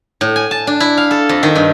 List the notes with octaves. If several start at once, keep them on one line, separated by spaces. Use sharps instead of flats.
A2
G#5
A5
D4
E4
F5
A4
F2
D#3
G2